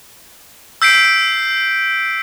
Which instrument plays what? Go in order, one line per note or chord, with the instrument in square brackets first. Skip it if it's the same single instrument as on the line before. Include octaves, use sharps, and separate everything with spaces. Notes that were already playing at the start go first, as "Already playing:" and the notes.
[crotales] E6 G6 B6 C7 D7